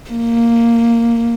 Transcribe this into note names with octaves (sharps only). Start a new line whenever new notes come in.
A#3